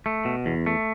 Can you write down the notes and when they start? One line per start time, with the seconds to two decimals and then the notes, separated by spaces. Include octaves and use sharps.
0.06 A3
0.25 B2
0.46 E2
0.66 A3